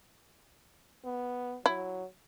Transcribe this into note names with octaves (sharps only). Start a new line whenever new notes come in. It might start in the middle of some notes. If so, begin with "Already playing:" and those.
B3
F#3 E4